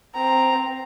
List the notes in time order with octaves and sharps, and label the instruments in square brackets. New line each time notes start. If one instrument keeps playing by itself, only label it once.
[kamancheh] C4 A#5